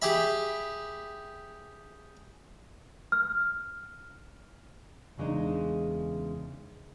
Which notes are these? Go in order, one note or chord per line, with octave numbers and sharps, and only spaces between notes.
G4 G#4 E5 B5
F6
E2 C#3 G#3 D4 D#4